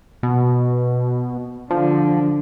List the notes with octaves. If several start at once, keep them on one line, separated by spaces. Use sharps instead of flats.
B2
D3 F3